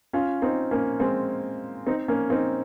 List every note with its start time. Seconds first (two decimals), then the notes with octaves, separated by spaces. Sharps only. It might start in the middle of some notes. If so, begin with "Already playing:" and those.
0.13 C#4 F4
0.42 C4 D#4
0.71 A#3 C#4
1.00 G#3 C4
1.87 C4 D#4
2.08 A#3 C#4
2.30 C4 D#4